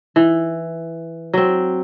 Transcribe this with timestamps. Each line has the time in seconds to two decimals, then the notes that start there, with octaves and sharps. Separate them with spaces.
0.16 E3
1.33 F#3 C4